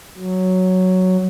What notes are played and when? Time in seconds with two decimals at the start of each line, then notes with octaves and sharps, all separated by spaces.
0.18 F#3